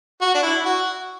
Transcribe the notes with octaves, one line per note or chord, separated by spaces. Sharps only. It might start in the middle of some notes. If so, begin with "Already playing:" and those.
F#4
D4
E4
F#4